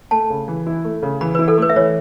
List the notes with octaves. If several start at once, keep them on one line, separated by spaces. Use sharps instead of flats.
A3 A5
C#3
E3
E4
A3
C#3
E3 B5
E4 B4
A4
A3 B4
E5
E3 C#5